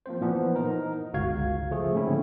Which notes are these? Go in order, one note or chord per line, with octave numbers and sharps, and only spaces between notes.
F3 A#3 C4 C5
A#2 E3 F3 B3
D#4 A#4
G1 C#2 F#4 F5 G#6
C#3 F3 A3 G#4
G#2 D3 A#3 C4 C#4 E4